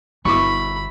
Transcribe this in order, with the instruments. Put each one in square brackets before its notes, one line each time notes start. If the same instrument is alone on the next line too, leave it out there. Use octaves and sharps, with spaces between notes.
[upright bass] G1 [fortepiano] B2 E4 D6 [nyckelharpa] B5 [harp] C#6